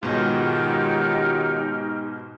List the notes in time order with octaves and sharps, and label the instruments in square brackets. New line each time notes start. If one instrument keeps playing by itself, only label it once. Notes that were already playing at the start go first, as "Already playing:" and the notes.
[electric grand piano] G#2 B2 [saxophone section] D#3 F#3 F4 [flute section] D#4 G4 F6